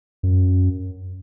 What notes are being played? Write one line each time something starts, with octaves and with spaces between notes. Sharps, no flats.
F#2